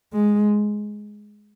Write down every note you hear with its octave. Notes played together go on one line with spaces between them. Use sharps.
G#3